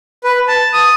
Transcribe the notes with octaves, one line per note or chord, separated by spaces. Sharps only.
B4
A5
D#6